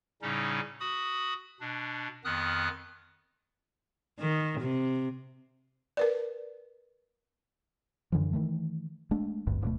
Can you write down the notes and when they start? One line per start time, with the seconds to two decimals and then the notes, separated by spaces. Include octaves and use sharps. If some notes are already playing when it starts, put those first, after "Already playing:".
0.22 A2 C#3 G3 C#4 D#4
0.80 F#4 B5 D#6
1.60 B2 D4
2.24 F2 D#3 B3 D#6 F6 F#6
4.20 D#3
4.61 C3
5.97 A#4 B4 D5
8.12 F#2 D3 E3 F3
8.33 D#3 E3 A3
9.11 G#3 A3 D4
9.47 G#1 D2 G2
9.62 D1 B2 A3